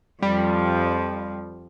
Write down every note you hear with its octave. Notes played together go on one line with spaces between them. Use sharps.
F2 F3 G3